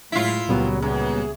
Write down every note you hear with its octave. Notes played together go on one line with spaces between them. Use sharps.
A2 F#3 G#3 E4 F4 B6 C7
C#2 A#2 C#3 F#3 G3 B3
F#2 G#4